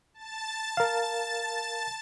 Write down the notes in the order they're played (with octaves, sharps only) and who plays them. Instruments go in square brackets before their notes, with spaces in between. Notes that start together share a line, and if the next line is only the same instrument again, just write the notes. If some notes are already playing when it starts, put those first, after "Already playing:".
[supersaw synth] A5 A6
[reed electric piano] A#4 F5